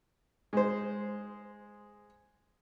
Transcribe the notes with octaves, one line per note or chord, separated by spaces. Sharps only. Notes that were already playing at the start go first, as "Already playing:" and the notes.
G#3 C5